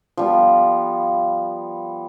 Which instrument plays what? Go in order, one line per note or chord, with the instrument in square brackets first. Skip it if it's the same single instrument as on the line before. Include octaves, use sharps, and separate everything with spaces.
[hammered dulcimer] F3 G3 B3